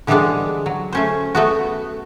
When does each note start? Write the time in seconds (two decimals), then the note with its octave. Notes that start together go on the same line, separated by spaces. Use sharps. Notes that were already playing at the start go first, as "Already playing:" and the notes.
0.07 D3 E3 G3 G#3 B3 D4
0.66 F#3
0.93 A3 C#4 C5
1.35 A3 B3 F#4